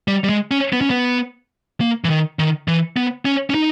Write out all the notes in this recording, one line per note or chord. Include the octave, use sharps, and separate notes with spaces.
G3
G3
G#3
C#4
B3
C#4
B3
A#3
E3
D#3
D#3
E3
B3
C#4
C#4
D#4